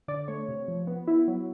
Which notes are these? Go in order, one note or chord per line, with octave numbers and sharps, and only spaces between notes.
D3 D5
A3 C#5
C3
F3
B3
E4
F#3